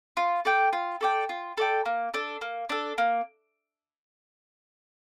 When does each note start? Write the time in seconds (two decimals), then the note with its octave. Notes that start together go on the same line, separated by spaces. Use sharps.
0.17 F4
0.45 A4 D5 G5
0.73 F4
1.01 A4 D5 G5
1.29 F4
1.57 A4 D5 G5
1.85 A#3
2.14 D4 A4
2.41 A#3
2.69 D4 A4
2.98 A#3